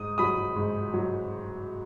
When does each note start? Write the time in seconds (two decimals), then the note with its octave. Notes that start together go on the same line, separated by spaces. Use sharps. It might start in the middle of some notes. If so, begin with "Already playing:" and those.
Already playing: G#2 D#6
0.18 F#3 B5 D#6
0.56 G#2
0.94 F#3